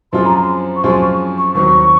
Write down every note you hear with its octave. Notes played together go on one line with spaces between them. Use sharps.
F#2 F3 C4 F4 G#4 C6
A#5
C6
C#6
F#2 F3 C4 F4 G#4 C6
C#6
C#6
D#2 D#3 F#3 C4 C#6